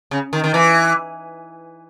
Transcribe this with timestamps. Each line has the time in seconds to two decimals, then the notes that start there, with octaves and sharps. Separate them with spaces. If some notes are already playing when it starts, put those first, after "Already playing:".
0.11 C#3
0.33 D#3
0.44 D#3
0.54 E3